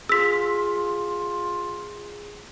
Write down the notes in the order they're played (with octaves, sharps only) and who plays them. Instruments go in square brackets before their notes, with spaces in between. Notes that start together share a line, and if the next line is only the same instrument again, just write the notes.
[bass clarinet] F4 [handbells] G#4 C6 [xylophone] E6 B6